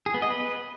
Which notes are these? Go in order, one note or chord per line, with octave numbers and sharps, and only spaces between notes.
G#4
B3
D#5
B4